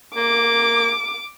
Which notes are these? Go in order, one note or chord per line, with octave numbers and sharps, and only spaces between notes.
A#3 D6